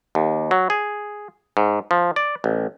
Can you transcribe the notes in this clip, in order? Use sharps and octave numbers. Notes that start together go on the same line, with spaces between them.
D#2
F#3
G#4
G#2
F3
D5
A1